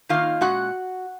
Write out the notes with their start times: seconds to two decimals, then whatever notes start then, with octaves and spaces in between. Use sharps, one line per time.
0.09 D#3 A#3 D#4 F4 F5
0.41 A#2 G#3 C#4 F#4 F#5